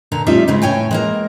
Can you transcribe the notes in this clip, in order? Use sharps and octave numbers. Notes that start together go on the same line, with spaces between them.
A#2 D3 A#5
G3 A3 C#4 D#4 F4 E5
G#2 C#3 G#3 C4
A2 C#5 G5 G#5
G#3 A#3 A#4